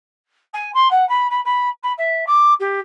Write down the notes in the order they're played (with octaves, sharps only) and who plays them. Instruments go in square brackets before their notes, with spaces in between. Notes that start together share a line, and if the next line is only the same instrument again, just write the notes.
[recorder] G#5
C6
F#5
B5
B5
B5
B5
E5
D6
G4